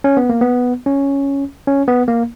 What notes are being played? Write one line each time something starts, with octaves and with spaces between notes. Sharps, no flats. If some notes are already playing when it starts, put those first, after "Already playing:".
C#4
B3
A#3
B3
C#4
C#4
B3
A#3